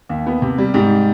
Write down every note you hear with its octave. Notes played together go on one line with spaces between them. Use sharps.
D#2
B3
C3
G3
G#2 G4